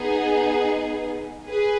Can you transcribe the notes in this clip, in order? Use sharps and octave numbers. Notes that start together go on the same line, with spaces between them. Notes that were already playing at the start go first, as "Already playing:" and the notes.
Already playing: B3 D#4 G#4
G#4 B4